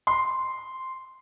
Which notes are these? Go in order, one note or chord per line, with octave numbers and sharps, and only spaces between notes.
C6